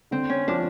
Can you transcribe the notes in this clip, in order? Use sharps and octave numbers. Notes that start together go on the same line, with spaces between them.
D3 C4
C#4
F3 D4